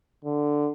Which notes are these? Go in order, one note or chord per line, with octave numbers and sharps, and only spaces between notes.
D3